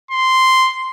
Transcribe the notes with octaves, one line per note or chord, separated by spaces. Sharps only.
C6